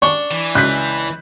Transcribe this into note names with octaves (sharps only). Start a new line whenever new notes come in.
D4 C#6
E3
C#2 F#6 G6 B6